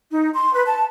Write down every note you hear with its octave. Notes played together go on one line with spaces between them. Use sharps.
D#4
C6
B4
A5